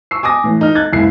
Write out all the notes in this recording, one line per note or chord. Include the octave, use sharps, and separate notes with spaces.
C#6 E6 C7
G#5 D6 D#6 A#6
A2 E3
D#4 F6
F#6 G#6 A6
F#1 C#2 E4 C7